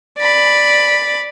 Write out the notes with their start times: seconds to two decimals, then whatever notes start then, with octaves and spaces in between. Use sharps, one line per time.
0.18 D5 B5